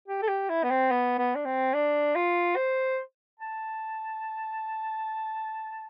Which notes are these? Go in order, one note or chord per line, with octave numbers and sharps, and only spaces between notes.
G4
A4
G4
E4
B3
C4
B3
B3
D4
C4
D4
F4
C5
A5